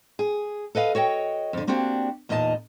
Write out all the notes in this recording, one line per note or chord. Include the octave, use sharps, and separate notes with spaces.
G#4
A4 B4 D#5 F5
F#4 C#5 D#5 G5
F2 D3
A#3 C4 D4 F#4 G4
E2 A#2 D#4 D#5 A5